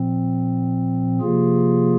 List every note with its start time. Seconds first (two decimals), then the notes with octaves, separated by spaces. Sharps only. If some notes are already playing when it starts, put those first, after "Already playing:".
Already playing: A#2 F3 C4
1.21 C3 F3 A#3 F4 G#4